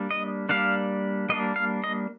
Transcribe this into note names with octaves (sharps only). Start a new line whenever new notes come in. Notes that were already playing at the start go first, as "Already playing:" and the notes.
Already playing: G3 A#3 D4
D#5
G3 A#3 D4 F5
G3 A#3 D4 D#5
F5
D#5